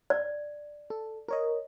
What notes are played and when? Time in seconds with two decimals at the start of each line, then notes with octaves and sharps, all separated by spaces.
0.10 D5
0.90 A4
1.28 A#4 C#5 D#5